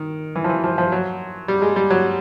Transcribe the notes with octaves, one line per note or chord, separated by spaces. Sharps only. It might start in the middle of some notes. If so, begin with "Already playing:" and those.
Already playing: D#3
E3
F3
E3
F3
F3
F#3
G3
G#3
G3
F#3